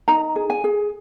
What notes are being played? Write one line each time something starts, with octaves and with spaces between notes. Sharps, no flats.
D#4 A#5
G#4
G#5
G#4